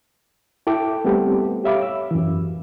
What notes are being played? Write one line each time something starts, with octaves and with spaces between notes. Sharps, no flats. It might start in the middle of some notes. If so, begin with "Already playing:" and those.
E4 A4 E5 G5 D6
G3 A3 B3 C4 G4 A4
G4 C#5 E5 F5 B5 D6
E6
F#2 E3